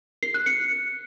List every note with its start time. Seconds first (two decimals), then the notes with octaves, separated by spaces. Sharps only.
0.23 C7
0.34 F#6
0.46 C#7